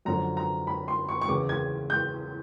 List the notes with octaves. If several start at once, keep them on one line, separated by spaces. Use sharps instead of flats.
F#2 D3 F3 A#5
A#5
B5
C6
C#6
C#6
E2 C#3 E3 D6
G#6
G6